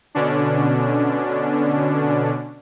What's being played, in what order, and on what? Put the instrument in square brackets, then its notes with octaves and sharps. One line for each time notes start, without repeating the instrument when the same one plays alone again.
[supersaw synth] B2 D3 C#4 D4